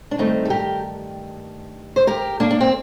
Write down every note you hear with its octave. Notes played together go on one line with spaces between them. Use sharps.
D4
G2 D#3 A3 C4 D#4
A4
G4 A#4
C5
G4 A#4
A#3 D4
D4
C4